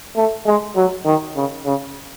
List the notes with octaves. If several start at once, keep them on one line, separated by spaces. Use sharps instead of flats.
A3
G#3
F#3
D#3
C#3
C#3